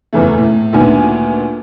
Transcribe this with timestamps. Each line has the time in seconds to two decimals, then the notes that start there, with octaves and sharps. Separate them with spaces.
0.13 E2 C#3 E3 A3
0.38 A2
0.73 D2 A#2 D#3 B3 D4 G#5